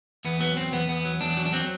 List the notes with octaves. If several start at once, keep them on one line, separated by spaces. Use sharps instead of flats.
E2 B3
F#3 B3
E2 C4
E2 B3
E2 B3
F#3
E2 D4
F#3
D4
F#3 C4